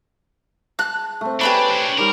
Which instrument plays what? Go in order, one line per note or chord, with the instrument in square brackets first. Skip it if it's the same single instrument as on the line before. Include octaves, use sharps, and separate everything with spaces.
[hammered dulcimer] A5 [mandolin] F#6
[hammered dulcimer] A3 C4
[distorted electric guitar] D4 [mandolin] G4 B4 B5 [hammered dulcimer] C#5 G#5
[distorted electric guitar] D4 C5
[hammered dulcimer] D#3 G3 [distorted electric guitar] A#4